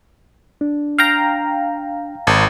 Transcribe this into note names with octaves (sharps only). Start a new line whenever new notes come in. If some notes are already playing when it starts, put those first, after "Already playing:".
D4
F5 G5 A#5
G#1